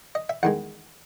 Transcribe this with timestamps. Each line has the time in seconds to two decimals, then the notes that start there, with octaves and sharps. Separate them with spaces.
0.15 D#5
0.29 E5
0.43 E2 D#3 G#3 F#5